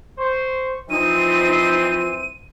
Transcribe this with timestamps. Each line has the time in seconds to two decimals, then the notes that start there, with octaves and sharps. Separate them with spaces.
0.18 C5 C#6
0.90 E3 F3 C4 D#4 D#7